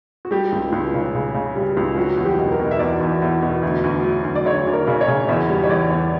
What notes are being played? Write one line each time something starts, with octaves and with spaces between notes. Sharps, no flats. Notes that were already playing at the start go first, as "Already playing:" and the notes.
F#4
G3 G4
C#2
C#2
C#3
C#3
C#3
G3
C#2
F#3 F#4
E2
G4
B2
A#4
B2
E5
E2 D5
E2
E2
B2
D2
D2
F#3
D2
D5
D2 C#5
D2
A#4
C#3
C#5
C#3
E2 E5
G3
C#5
E2 D5
E2